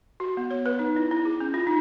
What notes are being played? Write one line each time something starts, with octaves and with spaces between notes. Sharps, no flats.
F#4
B3
C#5
B4
D#4
E4
E4
G#4
C#4
F4
D#4